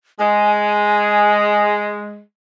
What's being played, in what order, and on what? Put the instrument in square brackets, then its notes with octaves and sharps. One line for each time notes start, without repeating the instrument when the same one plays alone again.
[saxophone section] G#3 [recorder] G#5